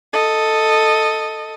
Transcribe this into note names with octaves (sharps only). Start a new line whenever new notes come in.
A4 D#5